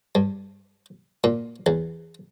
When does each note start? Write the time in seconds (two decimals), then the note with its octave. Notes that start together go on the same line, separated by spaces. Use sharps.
0.15 G2
1.24 A#2
1.66 E2